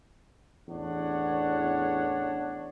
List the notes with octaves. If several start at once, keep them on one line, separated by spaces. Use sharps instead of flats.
A1 E2 D4 C#5 F#5